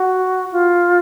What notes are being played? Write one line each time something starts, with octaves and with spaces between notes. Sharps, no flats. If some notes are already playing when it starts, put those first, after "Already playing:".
Already playing: F#4
F4